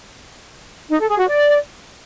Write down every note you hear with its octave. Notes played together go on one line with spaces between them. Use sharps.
D#4
A4
G#4
F#4
D5